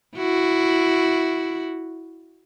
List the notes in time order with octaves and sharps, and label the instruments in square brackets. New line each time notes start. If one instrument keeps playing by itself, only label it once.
[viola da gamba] E4 F#4